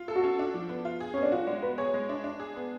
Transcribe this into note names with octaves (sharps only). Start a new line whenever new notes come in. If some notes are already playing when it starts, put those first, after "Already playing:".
Already playing: F4
A4
F#4
C#4
D4
F3
B3
F4
G#4
B3 C#4
D4
F4 F#4
G#3 D4
B3 B4
G#4 C#5
G#3
D4
D4
G#4
B3